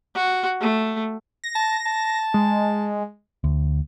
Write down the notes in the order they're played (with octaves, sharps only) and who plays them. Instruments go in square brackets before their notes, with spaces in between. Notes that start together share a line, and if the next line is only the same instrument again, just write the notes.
[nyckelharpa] F#4
A3
[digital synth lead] A#6
[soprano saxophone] A5 [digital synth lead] A#6
[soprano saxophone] A5
[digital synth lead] G#3
[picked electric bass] D2